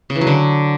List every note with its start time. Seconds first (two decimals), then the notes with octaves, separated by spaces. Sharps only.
0.10 C#3
0.16 E3
0.21 F#3
0.27 D3